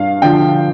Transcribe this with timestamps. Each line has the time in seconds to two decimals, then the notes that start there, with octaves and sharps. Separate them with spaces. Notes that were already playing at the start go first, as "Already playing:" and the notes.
Already playing: G2 F5
0.22 D3 F3 G5